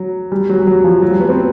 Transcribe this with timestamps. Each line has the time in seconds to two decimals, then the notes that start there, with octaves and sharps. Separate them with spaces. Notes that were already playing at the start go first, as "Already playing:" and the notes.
Already playing: F#3
0.32 G3
0.49 F#3
0.60 G3
0.67 F#3
0.84 F3
1.02 F#3
1.11 G3
1.20 B3
1.29 C4